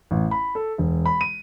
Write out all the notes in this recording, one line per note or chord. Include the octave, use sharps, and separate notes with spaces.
A1
B5
A4
E1
B5
D#7